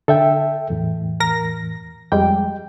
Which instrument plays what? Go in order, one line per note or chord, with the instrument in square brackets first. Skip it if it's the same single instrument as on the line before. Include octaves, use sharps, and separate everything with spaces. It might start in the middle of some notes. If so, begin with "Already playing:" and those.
[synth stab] D3 [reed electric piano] A4 E5 G5
[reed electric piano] E2 A2 E3
[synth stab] A#4 A#6
[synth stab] F2 G3 G#3 [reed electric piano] G5